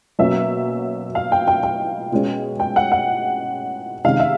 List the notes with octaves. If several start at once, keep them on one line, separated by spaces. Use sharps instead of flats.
B2 F#3 A#3 C#4 E5
F5
G5
G5
G5
B2 G#3 C#4
G5
F#5
F#5
C3 D#3 G#3 C#4 F5
E5